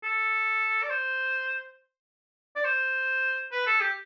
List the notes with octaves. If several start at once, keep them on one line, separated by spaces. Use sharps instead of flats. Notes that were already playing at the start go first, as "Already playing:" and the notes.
A4
D5
C5
D5
C5
B4
A4
G4